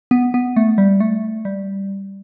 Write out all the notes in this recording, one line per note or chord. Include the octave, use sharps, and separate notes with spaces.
B3
B3
A3
G3
A3
G3